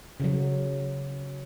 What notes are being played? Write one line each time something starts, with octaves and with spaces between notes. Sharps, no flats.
C#3 F#3